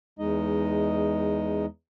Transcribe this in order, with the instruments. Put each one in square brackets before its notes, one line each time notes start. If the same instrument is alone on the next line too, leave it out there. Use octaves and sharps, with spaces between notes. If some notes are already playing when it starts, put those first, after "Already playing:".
[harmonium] E2 G#3 D#4 D#5